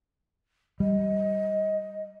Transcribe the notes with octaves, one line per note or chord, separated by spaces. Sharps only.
G3 D#5